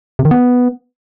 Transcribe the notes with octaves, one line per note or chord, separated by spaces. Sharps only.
C3
D#3
B3